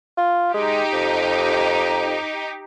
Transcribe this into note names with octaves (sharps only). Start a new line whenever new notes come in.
F4
G#3 D#4 G4
F2